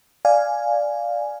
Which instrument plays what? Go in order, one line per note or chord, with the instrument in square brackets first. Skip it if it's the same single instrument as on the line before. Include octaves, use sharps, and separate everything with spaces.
[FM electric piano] D5 F5 G#5